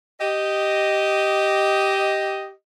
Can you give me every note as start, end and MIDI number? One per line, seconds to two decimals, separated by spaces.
0.20 2.52 67
0.20 2.52 75